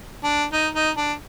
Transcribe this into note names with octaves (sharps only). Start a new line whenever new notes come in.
D4
D#4
D#4
D4